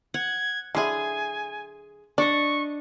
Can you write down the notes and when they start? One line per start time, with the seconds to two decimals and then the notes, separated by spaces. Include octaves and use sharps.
0.14 F#5 G#6
0.75 D3 F#3 E4 G#4 G#5 C6
2.18 D4 D5 D#5 C#6